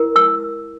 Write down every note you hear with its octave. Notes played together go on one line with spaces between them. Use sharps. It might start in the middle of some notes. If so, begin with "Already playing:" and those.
Already playing: E4 A#4
E6